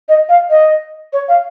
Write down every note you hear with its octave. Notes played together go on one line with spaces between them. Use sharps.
D#5
F5
D#5
C#5
F5